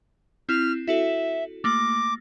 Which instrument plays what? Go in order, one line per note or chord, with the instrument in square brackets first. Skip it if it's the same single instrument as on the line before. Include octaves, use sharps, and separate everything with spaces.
[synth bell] C4 E4 [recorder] F6
[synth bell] E4 F#4 A4 [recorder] E5
[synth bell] A3 A#3 A#6 [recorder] D6